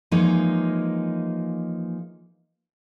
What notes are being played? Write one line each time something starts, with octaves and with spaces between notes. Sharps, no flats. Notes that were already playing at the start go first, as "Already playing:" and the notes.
E3 F3 G#3 A#3 D#4 C#5